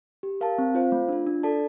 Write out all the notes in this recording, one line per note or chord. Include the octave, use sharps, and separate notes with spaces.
G4
A#4 F5 A5
C4
F4 C5 F5
A3
D4 F4
D4
A4 D5 A5